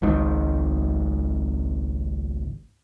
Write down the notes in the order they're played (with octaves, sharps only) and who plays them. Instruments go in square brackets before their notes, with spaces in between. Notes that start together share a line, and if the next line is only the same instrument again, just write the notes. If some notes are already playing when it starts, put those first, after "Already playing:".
[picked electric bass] G#1 C#2 G#2 D#3